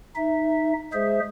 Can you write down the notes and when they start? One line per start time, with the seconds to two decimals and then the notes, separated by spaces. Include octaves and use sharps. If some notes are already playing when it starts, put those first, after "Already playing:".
0.16 D#4 E5
0.93 G#3 G#4 C5 E5